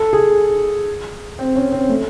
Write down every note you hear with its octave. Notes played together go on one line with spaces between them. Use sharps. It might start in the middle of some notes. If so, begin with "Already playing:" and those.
Already playing: A4
G#4
C4
C#4
C4
A3